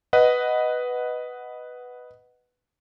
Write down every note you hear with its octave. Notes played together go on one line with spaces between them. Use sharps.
B4 D#5 F#5